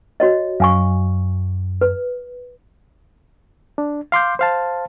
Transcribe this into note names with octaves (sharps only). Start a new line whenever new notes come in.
F#4 C#5 D#5
F#2 F5 G#5 C#6
B4
D4
F5 C6 D6 G6
C5 F5 A5